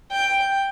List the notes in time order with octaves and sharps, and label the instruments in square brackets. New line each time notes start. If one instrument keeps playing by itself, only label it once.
[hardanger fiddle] G5